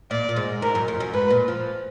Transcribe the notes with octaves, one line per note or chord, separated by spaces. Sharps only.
A#2 D5
A#2
G#2
G#2 A#4
F#2
F2
F#2
G#2 B4
A#2
F3